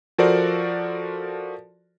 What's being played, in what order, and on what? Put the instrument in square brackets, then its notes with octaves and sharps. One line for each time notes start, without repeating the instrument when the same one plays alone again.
[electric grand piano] F3 F#4 A4 A#4 C5 D5